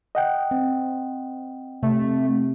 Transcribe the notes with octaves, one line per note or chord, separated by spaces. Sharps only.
D#5 F#5 G5
C4
C3 A3